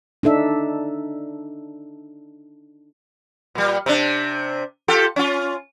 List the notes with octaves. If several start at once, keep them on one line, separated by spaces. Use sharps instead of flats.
D4 D#4 A4 E5
A#2 G3
C3 D4
F4 G4 A4
C#4 F4